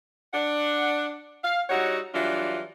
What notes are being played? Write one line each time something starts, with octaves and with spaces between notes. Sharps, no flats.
D4 F#5
F5
G3 D#4 E4 F#4 C#5 F#5
E3 F#3 G3 D4 F4